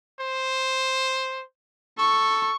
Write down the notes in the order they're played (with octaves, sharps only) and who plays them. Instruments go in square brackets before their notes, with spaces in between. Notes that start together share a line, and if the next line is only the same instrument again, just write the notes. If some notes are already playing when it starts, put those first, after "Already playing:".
[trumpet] C5
[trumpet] A4 [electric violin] C#6